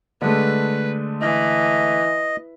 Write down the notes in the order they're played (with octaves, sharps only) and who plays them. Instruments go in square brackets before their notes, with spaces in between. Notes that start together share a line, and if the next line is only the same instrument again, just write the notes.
[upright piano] D3 G#3 A3 [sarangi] B4
[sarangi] E3 [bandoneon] D#5